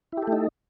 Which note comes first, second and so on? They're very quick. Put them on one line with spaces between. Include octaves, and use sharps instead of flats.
E4 G4 A4 A3 D#4